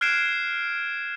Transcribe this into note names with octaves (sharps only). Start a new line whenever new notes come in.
F6 F#6 G#6 C7 D7 E7